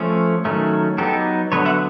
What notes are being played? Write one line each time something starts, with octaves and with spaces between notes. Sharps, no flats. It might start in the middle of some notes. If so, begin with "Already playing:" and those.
Already playing: F3 A3 C#4
D#3 F#3 A3 C#4
F#3 B3 D#4 G4 A4
D3 F#3 B3 B4 C#5
E5 F#5